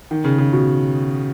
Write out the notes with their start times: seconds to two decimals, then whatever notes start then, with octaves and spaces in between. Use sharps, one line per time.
0.11 D#3
0.24 C#3
0.38 C#3
0.53 B2